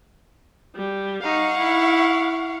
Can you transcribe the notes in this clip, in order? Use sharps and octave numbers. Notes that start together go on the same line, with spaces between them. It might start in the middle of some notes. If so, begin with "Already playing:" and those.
G3
D#4 F5 F#5 C#6
E4